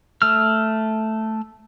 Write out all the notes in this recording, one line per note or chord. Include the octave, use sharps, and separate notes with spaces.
A3 E6 F6